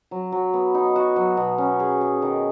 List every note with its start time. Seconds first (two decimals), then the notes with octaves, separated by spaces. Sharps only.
0.11 F#3
0.32 F#3
0.54 B3
0.74 D#4
0.96 F#4
1.16 F#3
1.37 B2
1.58 C#4
1.80 G#4
2.01 G#4
2.22 D#3